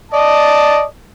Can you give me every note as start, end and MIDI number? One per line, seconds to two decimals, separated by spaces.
0.12 0.83 74
0.12 0.83 75
0.12 0.83 81